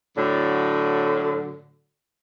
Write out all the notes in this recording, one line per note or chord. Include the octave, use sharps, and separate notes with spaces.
A2 D3 F#3